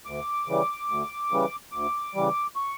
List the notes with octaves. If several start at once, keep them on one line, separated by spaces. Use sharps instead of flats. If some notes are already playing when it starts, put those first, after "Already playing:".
D2 D6
C#3 E3 G3
D2
C#3 E3 G3
D2 D6
C#3 E3 G3
C#6